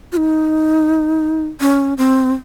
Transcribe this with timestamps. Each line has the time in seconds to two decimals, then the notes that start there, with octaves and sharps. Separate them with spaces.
0.12 F4
0.17 D#4
1.60 C#4
1.98 C4